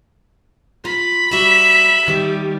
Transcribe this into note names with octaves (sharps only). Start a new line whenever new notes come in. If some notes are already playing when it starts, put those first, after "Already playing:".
F4 B5
G3 F#4 E5 A#5
E2 D#3 G3 G4